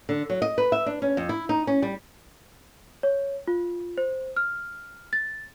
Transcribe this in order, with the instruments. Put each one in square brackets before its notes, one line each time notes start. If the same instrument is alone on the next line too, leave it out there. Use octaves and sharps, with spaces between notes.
[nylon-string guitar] D3
F#3
D#5
B4
E5
D4
C#4
F2
E4
D#4
C#4
G3
[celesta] C#5
F4
C5
F6
A6